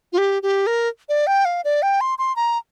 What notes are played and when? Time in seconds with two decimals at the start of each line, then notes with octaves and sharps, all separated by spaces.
0.13 F4
0.18 G4
0.43 G4
0.67 A#4
1.09 D5
1.27 G5
1.45 F5
1.64 D5
1.82 G5
2.01 C6
2.18 C6
2.36 A#5